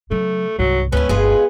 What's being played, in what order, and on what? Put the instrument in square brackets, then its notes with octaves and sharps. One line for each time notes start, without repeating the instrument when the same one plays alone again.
[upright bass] C#3 F#3 [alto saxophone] A3
[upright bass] C2 G2 [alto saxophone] F#3
[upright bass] D2 G#2 [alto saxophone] B3 [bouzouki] C#4 E4
[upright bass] G1 D2 [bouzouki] G#3 F4 G#4